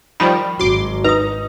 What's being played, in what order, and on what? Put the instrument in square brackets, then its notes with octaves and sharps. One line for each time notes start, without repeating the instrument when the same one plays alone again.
[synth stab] D#3 F3 G3 [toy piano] B5
[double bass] G#1 [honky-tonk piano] F#3 [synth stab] C6 D6
[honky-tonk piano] D#4 [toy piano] B4 D#6 [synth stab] A#5